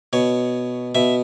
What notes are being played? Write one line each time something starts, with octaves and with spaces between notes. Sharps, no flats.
B2 C#5
B2 E5